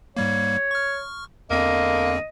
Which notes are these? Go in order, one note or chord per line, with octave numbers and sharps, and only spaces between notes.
G#2 G3 A#3 C#5
C#6 F6
E2 D3 A#3 C4 D#5